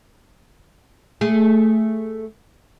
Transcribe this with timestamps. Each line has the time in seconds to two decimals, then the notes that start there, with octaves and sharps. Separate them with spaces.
1.21 A3 G#4